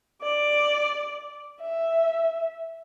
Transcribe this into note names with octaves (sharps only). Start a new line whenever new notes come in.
D5
E5